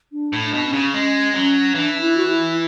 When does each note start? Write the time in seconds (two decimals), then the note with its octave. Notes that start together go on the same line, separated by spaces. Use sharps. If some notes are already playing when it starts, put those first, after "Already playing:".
0.12 D4
0.33 A2
0.39 D4
0.54 B2
0.67 C#4
0.73 C#3
0.94 G#3 C#4
1.34 F#3 C#4
1.75 E3 D4
1.94 D4
2.01 E4
2.17 F#4
2.28 E4